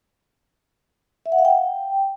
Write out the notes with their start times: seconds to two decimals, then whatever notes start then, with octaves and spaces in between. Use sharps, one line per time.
1.26 E5
1.32 F#5
1.38 F5
1.45 G5